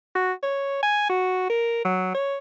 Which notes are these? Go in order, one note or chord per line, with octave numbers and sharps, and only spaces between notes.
F#4
C#5
G#5
F#4
A#4
F#3
C#5